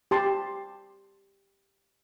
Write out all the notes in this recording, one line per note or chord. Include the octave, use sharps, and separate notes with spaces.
G4 A5 C6